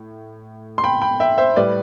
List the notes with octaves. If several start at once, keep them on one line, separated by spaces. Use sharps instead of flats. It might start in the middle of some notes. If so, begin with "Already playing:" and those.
Already playing: A2
C6
G5 B5
G5 B5
E5 G5
C5 E5
A2 G3 B4 D5